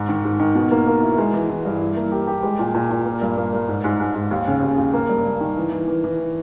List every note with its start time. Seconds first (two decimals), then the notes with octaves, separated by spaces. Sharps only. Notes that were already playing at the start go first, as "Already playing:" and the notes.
Already playing: G#2
0.09 D#3
0.24 G#2
0.40 D#3
0.55 B2
0.71 A#3
0.87 A#3
1.02 E4
1.18 G#3
1.33 E3
1.50 E3
1.65 G2
1.81 E4
1.97 A#3
2.12 G4
2.27 G4
2.43 G#3
2.59 A#2
2.74 A#2
2.91 A#2
3.06 A#3
3.21 G2
3.37 A#3
3.53 G2
3.68 G#2
3.84 G#2
4.00 G#2
4.15 G#2
4.31 D#2
4.47 C#3
4.62 D#2
4.78 D#2
4.94 A#3
5.09 G2
5.25 G2
5.40 D#3
5.57 E3
5.72 E3
5.88 E3
6.04 E3